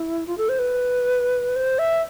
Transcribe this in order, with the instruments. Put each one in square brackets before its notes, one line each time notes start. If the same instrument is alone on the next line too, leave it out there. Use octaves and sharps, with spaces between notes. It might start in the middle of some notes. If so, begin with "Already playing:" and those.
Already playing: [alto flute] E4
F4
A4
C5
B4
C5
E5